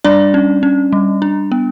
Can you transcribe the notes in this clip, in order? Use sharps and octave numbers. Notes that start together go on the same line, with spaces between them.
G3 D4 D5
C#4
C#4
G3
D4
B3